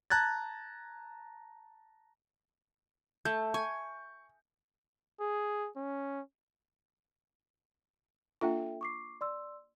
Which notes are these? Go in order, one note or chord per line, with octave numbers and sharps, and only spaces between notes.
A5 A#5 F#6 G#6 A6
A3 G6
G#5 C#6
G#4
C#4
A#3 D4 F4 A4 E5 G5
C#6 D6 C7
D5 C6 E6